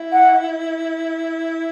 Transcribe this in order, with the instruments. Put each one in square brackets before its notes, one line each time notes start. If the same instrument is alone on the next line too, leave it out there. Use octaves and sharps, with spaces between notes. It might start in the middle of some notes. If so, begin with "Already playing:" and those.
Already playing: [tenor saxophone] E4
[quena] F#5